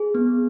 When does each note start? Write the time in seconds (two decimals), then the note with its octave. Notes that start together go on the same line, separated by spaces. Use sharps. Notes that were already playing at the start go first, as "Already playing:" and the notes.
Already playing: G#4
0.14 B3